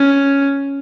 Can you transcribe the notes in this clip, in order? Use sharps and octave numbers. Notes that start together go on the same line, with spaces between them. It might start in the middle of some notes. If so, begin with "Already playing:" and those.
Already playing: C#4